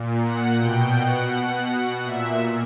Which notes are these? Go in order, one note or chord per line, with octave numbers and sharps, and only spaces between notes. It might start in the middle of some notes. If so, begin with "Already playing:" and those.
Already playing: A#2
F#5
B2 G5
F#5
B2
A#2 E5